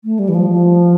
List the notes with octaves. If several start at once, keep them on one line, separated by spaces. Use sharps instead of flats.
A3
G3
E3
F3
F3